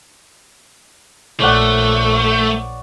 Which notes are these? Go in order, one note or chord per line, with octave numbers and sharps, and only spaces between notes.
A#1 A3 C#5 D5 F#5